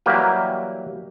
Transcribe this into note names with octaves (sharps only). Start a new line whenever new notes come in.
E3 F#3 G3 A#3 G4 B4